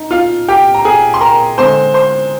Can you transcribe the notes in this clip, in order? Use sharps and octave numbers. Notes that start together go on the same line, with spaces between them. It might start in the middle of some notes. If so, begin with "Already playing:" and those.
Already playing: D#4
F4 F5
G4 G5
A#5
G#4 G#5
C6
A#4 A#5
D3 G#3 C4 C5 C6
C5 C6